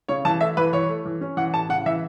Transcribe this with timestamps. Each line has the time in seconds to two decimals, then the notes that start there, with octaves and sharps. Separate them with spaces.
0.08 C#3 C#5
0.25 E3 A5
0.41 A3 E5
0.57 E3 B4
0.73 E3 C#5
0.89 A3
1.06 E3
1.21 C#4
1.37 E3 F#5
1.54 A2 A5
1.69 C#3 F#5
1.86 E3 E5